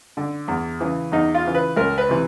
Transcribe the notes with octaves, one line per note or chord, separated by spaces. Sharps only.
D3
E2
C#3 E3
E2 D#4
F4
C#3 E3
B4
C#2 A#4
B4
C3 E3